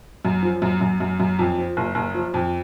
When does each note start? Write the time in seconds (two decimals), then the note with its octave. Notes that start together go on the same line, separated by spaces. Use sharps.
0.25 F#2
0.43 F3
0.62 F#2
0.81 F#2
1.00 F#2
1.20 F#2
1.39 F2
1.58 F3
1.77 F#1
1.95 F#1
2.14 F3
2.34 F2